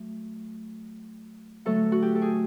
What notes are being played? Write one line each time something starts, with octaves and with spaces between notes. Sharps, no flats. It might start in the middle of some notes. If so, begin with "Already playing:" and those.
Already playing: F#3 A3
D3 F#3 A3 A4
F#4
G4
A4
G#4